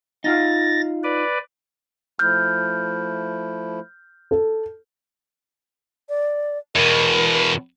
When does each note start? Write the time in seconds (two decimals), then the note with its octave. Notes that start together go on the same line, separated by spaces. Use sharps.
0.24 D#4 F4 F5 A6 A#6
1.03 B4 D5
2.19 F3 A3 E4 F6 G6
4.31 A4
6.09 D5
6.75 E2 B2 A#4